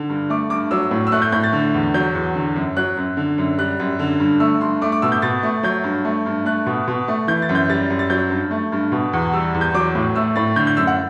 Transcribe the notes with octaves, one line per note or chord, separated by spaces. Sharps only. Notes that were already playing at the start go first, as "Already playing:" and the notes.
Already playing: D3
G2
A3 D6
G2 D6
F#3 E6
A2
E6
A3 F#6
G6
A2 G6
A6
D3
E2
F#3 G6
E2
D3
F#2
F#3 F#6
F#2
D3
F#2
G3 F#6
F#2
D3
G2
A3 E6
G2 C6
A3 D6
D6
B2 E6
G6
B2 A6
A3
F#3 G6
G2
A3
G2
A3 F#6
B2
B2
A3
E3 G6
A6
F#2
G6
G3 A6
F#2
A6
F#3 G6
G2
A3
G2
B2
E2
G3 E6
E2
G6
F#3 D6
A2
A3 E6
A2 A6
D3 G6
G6
F#2 E6
F#5